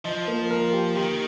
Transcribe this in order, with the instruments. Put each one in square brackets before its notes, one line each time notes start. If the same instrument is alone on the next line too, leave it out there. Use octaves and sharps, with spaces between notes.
[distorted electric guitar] F3 [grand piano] D#5
[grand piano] A#3
A#4
G4
[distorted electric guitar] D#3 [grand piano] G4